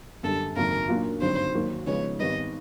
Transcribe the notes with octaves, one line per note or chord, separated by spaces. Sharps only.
F#2 D3 G3 A4
G#1 F#2 C#3 F#3 A#3 A#4
A#2 F#3 A#3 D4 F4
G#1 G2 D3 F#3 C5
D#2 D#3 F#3 A#3
C#3 F3 G#3 B3 C#5
G#1 G#2 D#3 G3 B3 D#5